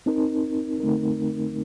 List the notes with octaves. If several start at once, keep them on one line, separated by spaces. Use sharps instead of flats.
C4 D#4 A#4
D3 A3 C4 D#4 A#4